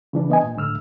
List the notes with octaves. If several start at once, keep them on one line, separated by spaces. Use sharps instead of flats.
C#3 E3 D4
B3 D#5 G#5
G2 A#2
C#2 A2 D3 E6 F6